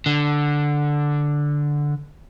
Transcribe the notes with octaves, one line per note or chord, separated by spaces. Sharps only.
D3